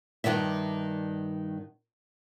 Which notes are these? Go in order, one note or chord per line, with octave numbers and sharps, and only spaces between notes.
G2 C3 D#3 D4 E5